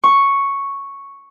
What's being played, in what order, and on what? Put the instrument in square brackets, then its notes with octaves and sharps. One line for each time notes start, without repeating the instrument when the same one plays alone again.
[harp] C#6